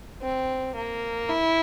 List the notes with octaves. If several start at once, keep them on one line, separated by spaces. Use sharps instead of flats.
C4
A#3
E4